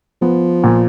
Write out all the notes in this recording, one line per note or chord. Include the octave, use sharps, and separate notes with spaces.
F3 B3
A#2